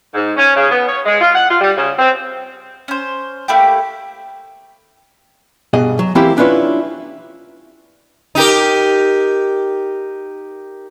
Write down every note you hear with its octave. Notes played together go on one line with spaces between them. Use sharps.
G#2
C#4
C#3
B3
C#5
G#3
F4
F#5
F4
G3
C#3
C4
C#4 C5
A3 A#3 E4 G4
G2 B2 G#4 D#5
F#3
E3 A#3 C4 E4 G4
C#4 D4 E4 F4 B4 C#5
D#4 G4 A#4